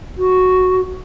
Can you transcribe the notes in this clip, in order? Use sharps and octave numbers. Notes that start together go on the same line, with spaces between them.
F#4